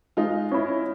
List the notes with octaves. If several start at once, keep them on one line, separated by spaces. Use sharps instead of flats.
G#3 D#4 F4
C#4 E4